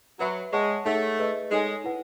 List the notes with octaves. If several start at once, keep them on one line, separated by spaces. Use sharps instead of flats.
F#3 B4 E5 B5
G#3 C#5 F#5 A5 C#6
A3 D#4 G#4 C#5 F#5
G#4 B4 D#5
G#3 D#4 A4 C#5 G#5
E4 B4 F#5